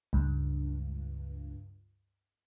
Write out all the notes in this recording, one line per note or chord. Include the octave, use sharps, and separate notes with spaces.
C#2 G2